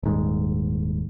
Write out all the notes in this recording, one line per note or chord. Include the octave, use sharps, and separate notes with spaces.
D#1 G#2